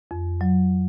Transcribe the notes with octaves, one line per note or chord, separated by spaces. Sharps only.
F2
F#3